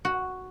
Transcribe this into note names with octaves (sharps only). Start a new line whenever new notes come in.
F#4